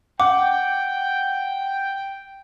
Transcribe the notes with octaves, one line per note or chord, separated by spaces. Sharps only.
F#5 G5 D6